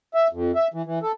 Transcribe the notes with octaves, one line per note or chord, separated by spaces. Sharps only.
E5
F2
E5
E3
E3
A4